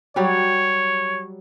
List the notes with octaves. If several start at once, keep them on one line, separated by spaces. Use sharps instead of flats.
F#3 G3 G4 C#5